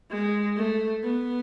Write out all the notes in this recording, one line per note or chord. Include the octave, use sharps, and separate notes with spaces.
G#3
A3
B3